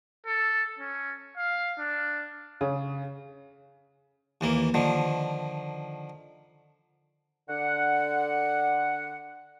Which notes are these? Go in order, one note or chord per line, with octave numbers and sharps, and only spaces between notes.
A4
C#4
F5
D4
C#3
D#2 E3 A#3
D3 D#3 F3
D3 F#5